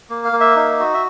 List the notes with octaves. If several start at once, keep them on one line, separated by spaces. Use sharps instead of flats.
A#3
F5
A#3
E5
D#4
F#4
E5